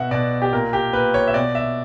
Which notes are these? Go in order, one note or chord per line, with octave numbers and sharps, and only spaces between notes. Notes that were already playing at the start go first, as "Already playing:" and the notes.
Already playing: B2 E5 F#5
B2 D5
G4
A#2 A#4
G4
A#2 B4
C#5
E5
B2 D5
E5